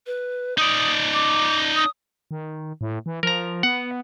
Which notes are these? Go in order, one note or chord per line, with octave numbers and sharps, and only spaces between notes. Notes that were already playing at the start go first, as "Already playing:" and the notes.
B4
D#4 D5 D#6
D6
D#6
D#3
A2
E3
F3 A#4 A#5
B3 F#5